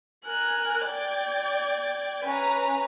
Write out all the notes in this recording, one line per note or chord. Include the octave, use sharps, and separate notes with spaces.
A#4 G#5 F#6
D5 G5 G#6
C#4 B4 A#5